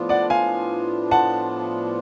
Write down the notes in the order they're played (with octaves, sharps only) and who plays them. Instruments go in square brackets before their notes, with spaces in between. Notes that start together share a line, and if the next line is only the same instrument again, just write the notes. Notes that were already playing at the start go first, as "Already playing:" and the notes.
Already playing: [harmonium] A2 F3 B3 D4 F4
[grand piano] D5 F#5
F5 G#5
F#5 A5